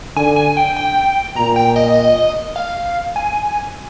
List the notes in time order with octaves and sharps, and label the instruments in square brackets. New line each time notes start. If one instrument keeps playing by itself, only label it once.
[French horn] D3 [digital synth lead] G#5
[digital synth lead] G#5
G5
G5
[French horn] A#2 [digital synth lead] A#5
[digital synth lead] G5
D#5
F5
G#5